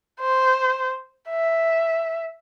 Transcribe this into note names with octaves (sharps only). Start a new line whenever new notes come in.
C5
E5